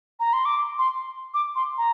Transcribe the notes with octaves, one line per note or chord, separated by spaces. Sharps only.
A#5
C6
D6
C6
D6
C6
A#5